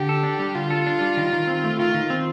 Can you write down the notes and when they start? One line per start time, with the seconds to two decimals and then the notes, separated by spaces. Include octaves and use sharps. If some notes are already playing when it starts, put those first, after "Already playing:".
Already playing: D3 G4
0.09 A4
0.23 D4
0.39 G3
0.55 D3 F4
0.70 A4
0.86 D4
1.01 G3
1.17 D#3
1.33 D#3
1.47 C4
1.64 A3
1.79 D#3 F4
1.94 D#3
2.10 C4